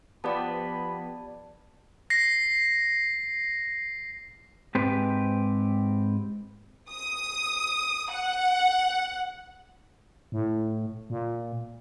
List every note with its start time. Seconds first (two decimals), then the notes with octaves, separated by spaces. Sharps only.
0.24 F3 B3 G4 D5 A5 B5
2.10 A#6 C7
4.75 G#2 C4 G4 B4
6.90 D#6
8.11 F#5
10.32 A2
11.10 A#2